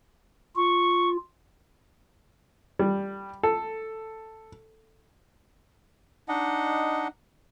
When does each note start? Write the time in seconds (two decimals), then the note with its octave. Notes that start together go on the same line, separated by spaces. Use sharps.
0.56 F4 C#6
2.79 G3
3.43 A4
6.29 D4 D#4 D#5 F#5